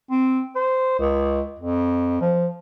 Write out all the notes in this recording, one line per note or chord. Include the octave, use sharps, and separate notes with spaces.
C4
C5
C#2
F2
F3